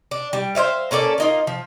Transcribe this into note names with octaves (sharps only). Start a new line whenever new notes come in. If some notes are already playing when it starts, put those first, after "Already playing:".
D4
G3
C5 C#5 E5 F5
A#3 C#4 A4 D5
A#3 D#4 F4
F3